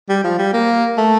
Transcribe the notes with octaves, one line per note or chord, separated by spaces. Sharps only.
G3
F3
G3
A#3
A3